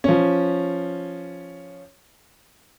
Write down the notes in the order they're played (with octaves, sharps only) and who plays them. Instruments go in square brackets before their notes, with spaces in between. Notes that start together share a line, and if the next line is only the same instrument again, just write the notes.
[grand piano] F3 C#4